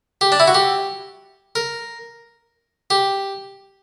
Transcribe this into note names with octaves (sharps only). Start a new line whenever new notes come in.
G4
D4
E4
F#4
G4
A#4
G4